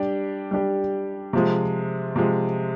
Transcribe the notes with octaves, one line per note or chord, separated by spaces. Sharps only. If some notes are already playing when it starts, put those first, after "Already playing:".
Already playing: G3 D4 G4
G3 D4 G4
C3 F3 G#3
C3 F3 G#3